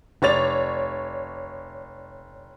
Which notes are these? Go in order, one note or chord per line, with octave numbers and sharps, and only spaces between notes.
F1 C#5 D5 A6 F7